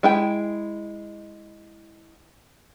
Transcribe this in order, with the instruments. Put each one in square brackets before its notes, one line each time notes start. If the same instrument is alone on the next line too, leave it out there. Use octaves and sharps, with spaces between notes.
[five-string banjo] G#3 E4 G5